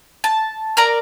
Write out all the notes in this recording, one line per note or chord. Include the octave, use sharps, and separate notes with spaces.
A5
A#4 D5 A#5